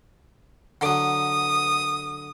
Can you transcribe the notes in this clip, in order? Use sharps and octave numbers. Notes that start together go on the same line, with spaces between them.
D3 F#3 D#6